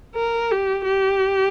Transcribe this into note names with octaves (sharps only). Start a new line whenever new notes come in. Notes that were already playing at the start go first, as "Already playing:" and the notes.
A#4
G4
G4